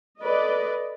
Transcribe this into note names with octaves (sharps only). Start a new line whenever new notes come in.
A4 B4 D5 D#5